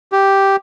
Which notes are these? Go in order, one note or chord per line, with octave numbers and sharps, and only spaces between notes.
G4